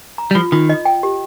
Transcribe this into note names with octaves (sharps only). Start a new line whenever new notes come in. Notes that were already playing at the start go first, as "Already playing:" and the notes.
A#5
G3
F3 F4
D#3 F4
D#5
G5
G4